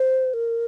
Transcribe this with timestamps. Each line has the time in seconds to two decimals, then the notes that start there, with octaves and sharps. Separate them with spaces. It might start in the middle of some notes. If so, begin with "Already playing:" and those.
Already playing: C5
0.34 A#4